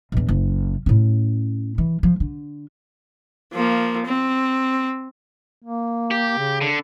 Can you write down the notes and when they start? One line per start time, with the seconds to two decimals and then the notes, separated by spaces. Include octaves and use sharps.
0.12 A#1 E2
0.29 F#1
0.86 A2 C#4
1.78 E3
2.03 F3
2.20 D3
3.53 F3 A#3
4.06 C4
5.63 A#3
6.11 G4
6.38 C#3
6.61 D3